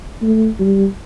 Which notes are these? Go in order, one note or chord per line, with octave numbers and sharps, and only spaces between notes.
A3
G3